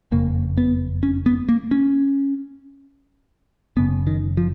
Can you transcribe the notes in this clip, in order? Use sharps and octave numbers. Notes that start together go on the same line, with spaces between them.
F#1 F2 C#3 A#3
B3
C#4
B3
A#3
C#4
F#1 F#2 C#3 B3
D#3
F3